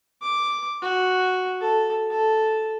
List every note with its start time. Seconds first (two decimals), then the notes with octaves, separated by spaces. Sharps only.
0.22 D6
0.82 F#4
1.60 A4
2.11 A4